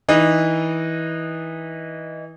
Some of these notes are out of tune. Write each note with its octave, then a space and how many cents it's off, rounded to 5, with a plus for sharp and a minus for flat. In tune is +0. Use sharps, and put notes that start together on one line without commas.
E3 -20 D#4 -15